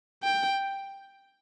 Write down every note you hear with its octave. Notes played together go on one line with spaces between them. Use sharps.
G5